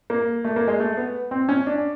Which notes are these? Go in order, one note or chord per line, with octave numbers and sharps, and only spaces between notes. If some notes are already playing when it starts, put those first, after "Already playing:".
A#3
A3
A#3
G#3
A3
B3
C4
C#4
D4